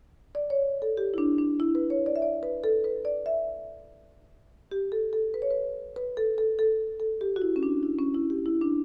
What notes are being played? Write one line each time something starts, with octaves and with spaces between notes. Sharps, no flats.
D5
C#5
A4
G4
E4
D4
D4
E4
B4
C#5
D5
E5
D5
B4
A4
B4
D5
E5
G4
A4
A4
B4
C#5
B4
B4
A4
A4
A4
A4
G4
F#4
E4
C#4
D4
E4
C#4
E4
G4
E4
D4